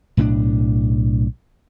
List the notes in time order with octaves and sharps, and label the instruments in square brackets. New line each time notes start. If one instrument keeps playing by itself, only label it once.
[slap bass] B1 A2 C4 D4